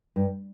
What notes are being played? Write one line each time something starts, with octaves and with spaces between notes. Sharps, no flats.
G2